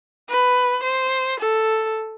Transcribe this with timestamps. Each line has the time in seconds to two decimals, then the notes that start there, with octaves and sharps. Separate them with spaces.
0.29 B4
0.84 C5
1.40 A4